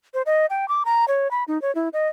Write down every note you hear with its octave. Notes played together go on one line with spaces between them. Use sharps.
C5
D#5
G5
D6
A#5
C#5
B5
D#4
C#5
E4
D#5